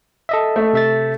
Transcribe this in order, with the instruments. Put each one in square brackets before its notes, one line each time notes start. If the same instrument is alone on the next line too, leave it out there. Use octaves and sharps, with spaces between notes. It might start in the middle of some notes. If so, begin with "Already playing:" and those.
[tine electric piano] A4 D#5 E5
[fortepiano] A3
[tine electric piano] C3 E5 A6